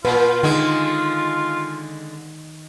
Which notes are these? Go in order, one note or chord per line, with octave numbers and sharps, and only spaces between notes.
A#2 F4 B4
D3 D#3 G#3